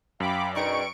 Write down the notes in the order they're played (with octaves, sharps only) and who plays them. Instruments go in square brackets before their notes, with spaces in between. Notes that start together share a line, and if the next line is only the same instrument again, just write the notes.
[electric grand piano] F#2 [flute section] F5 G5 [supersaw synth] B5 D6
[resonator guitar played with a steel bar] B2 D#4 G#4 [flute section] B4 D5 G5 [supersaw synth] C#6 D7